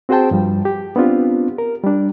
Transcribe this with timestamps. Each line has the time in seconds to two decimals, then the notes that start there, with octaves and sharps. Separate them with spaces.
0.09 C4 F#4 G#4 C5 G5 A5
0.31 G2 F3 G3
0.65 G4
0.96 B3 C4 D4 F4 G4
1.58 A#4
1.84 G3 D4